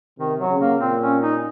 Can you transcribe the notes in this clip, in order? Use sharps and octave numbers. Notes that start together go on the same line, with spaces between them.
C3 D#3
F#3
C#3
A#3
A#2 C4
C#4
D#4